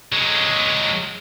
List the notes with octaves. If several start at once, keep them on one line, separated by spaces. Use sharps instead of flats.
F#3 G#3